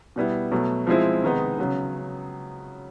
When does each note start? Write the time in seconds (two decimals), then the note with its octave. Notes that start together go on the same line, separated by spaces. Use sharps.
0.16 B2 G3 B3 E4
0.52 B2 F#3 A3
0.87 F3 G#3 C4 E4
1.23 C3 D#3 G#3 B3 D#4
1.58 C#3 F#3 B3